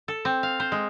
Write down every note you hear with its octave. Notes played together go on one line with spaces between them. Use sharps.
A4
C4
F5
C5
G#3